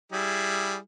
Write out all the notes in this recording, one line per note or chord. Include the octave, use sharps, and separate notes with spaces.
G3 E4 G#4